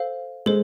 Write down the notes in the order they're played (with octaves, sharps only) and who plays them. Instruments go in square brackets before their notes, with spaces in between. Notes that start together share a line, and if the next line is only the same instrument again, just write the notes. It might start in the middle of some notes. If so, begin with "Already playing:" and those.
Already playing: [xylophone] A4 C5 F5
[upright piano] G#3 [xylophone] A4 C5